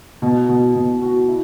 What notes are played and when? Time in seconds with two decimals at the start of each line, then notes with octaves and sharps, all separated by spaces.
0.22 B2
0.49 B2
0.75 B2
1.02 F#4
1.28 E4